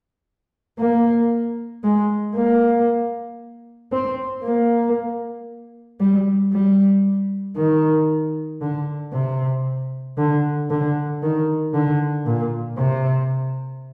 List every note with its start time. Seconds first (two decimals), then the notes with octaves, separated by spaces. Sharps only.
0.79 A#3
1.84 G#3
2.36 A#3
3.92 C4
4.44 A#3
6.00 G3
6.53 G3
7.57 D#3
8.61 D3
9.13 C3
10.18 D3
10.70 D3
11.22 D#3
11.74 D3
12.26 A#2
12.78 C3